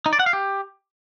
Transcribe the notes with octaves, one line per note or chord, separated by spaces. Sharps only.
D#4
D5
F#5
F5
G4